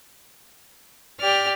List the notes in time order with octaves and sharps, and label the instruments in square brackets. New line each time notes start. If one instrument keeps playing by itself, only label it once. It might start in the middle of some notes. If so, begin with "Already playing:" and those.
[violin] G4 F6 [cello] D5